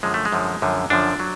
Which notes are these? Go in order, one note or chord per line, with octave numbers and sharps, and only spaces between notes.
F#2 D3 F3 G#3
A3
G#3
F#2 D3 F3
F#2 D3 F3
F#2 D3 F3 D4
F#3